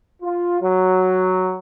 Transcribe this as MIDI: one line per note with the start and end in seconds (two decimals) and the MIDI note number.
0.22 0.59 65
0.60 1.58 54